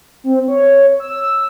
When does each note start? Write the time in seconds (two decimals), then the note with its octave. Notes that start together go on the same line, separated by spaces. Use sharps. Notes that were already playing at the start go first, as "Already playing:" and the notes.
0.24 C4
0.48 C#5
1.00 E6